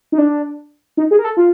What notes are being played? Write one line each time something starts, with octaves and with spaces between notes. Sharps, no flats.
D#4
D4
D#4
G#4
A#4
A4
F4